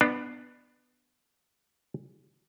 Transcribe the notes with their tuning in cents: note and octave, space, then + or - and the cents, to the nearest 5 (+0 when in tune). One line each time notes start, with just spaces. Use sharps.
B3 +0 D4 +25